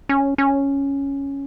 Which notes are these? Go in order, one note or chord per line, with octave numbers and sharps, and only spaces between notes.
C#4
C#4